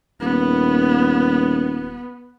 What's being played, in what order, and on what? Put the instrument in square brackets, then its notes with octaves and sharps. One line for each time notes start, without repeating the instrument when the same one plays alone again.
[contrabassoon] D#1 [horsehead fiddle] B3